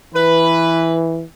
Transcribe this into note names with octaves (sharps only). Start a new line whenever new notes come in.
E3 B4